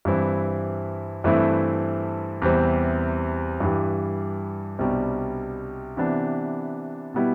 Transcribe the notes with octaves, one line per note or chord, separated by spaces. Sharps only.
G2 E3 G3 C4 E4
G2 E3 A3 C4 E4
E2 C3 E3 G3 C4
G2 E3 G3
C2 B2 G3 D4
C3 E3 B3 D4
B2 G3 B3 E4